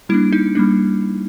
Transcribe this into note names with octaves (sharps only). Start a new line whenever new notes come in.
G3 A#3 D4 E4
D#4
G3 A#3 D4